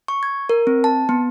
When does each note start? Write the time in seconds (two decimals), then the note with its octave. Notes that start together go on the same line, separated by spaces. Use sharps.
0.08 C#6
0.23 G#6
0.49 A#4
0.67 C4
0.84 A5
1.09 B3